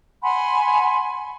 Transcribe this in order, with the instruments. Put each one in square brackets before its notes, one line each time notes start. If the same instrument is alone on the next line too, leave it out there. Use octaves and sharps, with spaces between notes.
[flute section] F#5 G#5 B5 C6